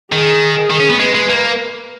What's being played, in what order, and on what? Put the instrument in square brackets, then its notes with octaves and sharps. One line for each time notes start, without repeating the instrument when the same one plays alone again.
[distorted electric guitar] D#3 [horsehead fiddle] G#4
[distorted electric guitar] D#3
C#4
B3
[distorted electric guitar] G#3 [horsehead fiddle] B4
[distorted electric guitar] G#3
A#3